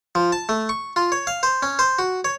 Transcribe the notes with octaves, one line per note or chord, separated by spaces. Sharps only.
F3
A5
A3
C#6
F4
C#5
F5
C5
C#4
C5
F#4
C#5